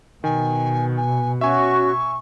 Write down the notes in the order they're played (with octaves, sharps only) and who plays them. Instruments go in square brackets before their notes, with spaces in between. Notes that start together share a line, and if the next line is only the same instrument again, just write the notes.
[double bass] B2 [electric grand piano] D#3 [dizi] G#5
[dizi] G#5
[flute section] C#4 F#4 [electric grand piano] E5 G#5 [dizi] C#6